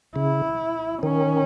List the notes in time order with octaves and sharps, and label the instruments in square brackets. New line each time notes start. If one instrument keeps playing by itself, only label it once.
[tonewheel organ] C#3 [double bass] E4
[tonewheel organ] D#3 [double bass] C#4